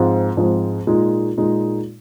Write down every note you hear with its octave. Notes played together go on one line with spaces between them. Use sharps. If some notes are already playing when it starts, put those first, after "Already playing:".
Already playing: G#2 F3 G#3 C4 F4
G#2 F3 G#3 C4 F4
A#2 G#3 D#4
A#2 G#3 D#4